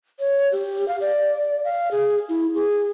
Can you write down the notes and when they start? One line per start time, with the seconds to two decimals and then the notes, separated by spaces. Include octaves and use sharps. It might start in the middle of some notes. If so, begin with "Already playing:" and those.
0.19 C#5
0.52 G4
0.88 F5
1.01 D5
1.64 F5
1.91 G#4
2.29 E4
2.55 G#4